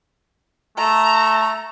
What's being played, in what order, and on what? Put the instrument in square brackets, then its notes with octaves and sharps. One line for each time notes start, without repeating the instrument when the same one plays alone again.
[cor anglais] A3 [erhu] A#5